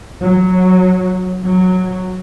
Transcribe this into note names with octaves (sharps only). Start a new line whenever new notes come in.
F#3
F#3